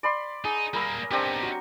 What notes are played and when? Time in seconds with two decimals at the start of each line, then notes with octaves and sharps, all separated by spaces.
0.03 D5 B5 C6
0.45 D#4 G#4
0.74 G3 A#3 A#4 B5 E6
1.11 B3 C4 D4 D#4 G4
1.42 F#3